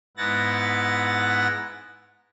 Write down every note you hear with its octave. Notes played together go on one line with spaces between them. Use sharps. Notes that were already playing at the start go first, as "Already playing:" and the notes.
G#2 B3 E4 F#5 A6 A#6